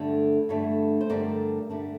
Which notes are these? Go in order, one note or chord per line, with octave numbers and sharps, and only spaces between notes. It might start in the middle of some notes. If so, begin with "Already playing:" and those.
Already playing: G2 D3 A3 D4
G2 D3 A3 D4
C5
G2 D3 A3 D4 A#4 D5
G2 D3 A3 D4